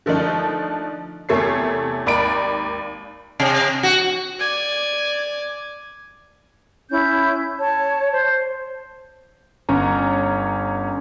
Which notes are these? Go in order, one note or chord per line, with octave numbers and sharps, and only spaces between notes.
D3 F3 A3 D4 D#4
E2 C3 A3 C#5 C7
G#1 D#2 D5 A#5 B5 D7
C3
F#4
D5 G#5
C#4 E4 G6
C#5 A5
C5
G1 C#4 C#5 A#5